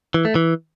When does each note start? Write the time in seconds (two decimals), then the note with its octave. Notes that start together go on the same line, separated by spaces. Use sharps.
0.14 E3
0.25 A3
0.35 E3